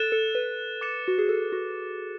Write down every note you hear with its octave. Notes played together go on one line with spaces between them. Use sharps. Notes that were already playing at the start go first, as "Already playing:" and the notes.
Already playing: A4 F#6 A6 E7
A4
B4
D6 A6 C#7 E7
F#4
G#4
A4
F#4